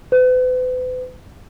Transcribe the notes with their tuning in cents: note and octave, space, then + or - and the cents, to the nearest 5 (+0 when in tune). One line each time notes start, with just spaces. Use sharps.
B4 +40